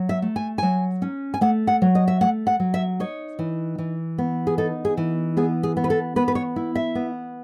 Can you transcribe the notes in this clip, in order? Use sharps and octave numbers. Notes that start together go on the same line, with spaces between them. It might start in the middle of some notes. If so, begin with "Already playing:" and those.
Already playing: F#3
E5
A3
G#5
F#3 G#5
C#4
G#5
A3 F#5
F#5
F#3
D#5
E5
A3 F#5
F#5
F#3
E5
D#4 C#5
E3
E3
B3
G#4
D#4 A4
G#4
E3
B3 G#4
G#4
B3
B4
A4
B3 B4
B4
C#5
E4
E5
B3